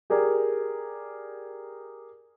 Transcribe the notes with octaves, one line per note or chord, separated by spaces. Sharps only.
G4 G#4 A#4 D5